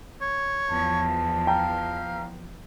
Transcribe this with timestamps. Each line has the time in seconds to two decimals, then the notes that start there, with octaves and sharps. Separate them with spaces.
0.21 C#5
0.70 E2 F3 A5
1.47 F5 G5 A#5